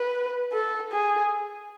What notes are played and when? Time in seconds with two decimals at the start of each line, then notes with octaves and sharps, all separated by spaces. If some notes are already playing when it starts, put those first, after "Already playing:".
Already playing: B4
0.53 A4
0.92 G#4